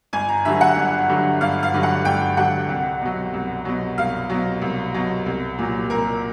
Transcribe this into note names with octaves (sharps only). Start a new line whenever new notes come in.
G1 G#5
A#5
G2 D3 F#3 E5
F#5
G1
G2 D3 F#3
G1 F5
F5
G2 D3 F#3
F#5
G1 G5
G2 D3 F#3 F#5
C2
B2 F#3
C2
B2 F#3
C2 F5
B2 F#3
C2
B2 F#3
C2
A#2 F#3
C2 A#4